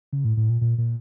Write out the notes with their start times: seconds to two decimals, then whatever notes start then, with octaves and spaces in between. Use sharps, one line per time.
0.13 C#3
0.25 A2
0.37 A2
0.50 A#2
0.61 A#2
0.78 A#2